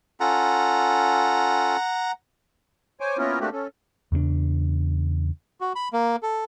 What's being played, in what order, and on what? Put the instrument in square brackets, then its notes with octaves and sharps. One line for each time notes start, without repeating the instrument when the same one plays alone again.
[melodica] C#4 F4 A4 [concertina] F#5 A#5
[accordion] C5 C#5 G#5 D6
A#3 B3 C#4 E4 F4 A#4
A3 A#3 C4 D4 F#4 G4
C#4 A4
[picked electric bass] E2 C#3 A#3 D4
[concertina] F#4
B5
A#3
A4